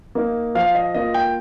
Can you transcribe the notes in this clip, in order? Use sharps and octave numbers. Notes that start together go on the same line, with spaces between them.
A#3 D#4
F3 F5
D#5
A#3 F4 D#5
G5